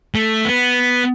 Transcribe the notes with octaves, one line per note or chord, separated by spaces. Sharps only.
A3
B3